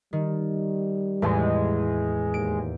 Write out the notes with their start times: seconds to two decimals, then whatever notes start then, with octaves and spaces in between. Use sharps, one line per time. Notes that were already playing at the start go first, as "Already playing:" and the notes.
0.13 D#3 G3
1.22 E2 A2 G#3
2.34 D#2 D7